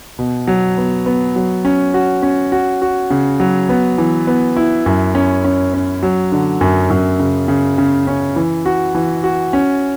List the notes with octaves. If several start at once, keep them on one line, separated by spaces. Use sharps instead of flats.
B2
F#3
B3
B3
F#3
C#4
F#4
C#4
F#4
F#4
C#3
F#3
B3
E3
B3
E4
F#2
C#4
C#4
C#4
F#3
D3
F#2
F#2
C#3
C#3
C#3
C#4
E3
F#4
E3
F#4
C#4